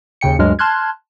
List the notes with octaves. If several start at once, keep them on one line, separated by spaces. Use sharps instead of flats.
D#2 C#3 G5 C#7
D2 G2 F#3 G#3 F6
A5 C6 F6 F#6 G#6